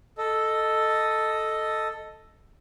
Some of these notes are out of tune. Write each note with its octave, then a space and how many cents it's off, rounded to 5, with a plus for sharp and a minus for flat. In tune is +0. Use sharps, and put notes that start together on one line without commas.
A4 +0 D#5 +0